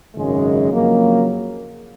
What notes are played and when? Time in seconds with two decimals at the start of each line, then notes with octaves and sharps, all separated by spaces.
0.15 G#1 F#2 C#3 G#3
0.71 F2 C#3 F#3 A#3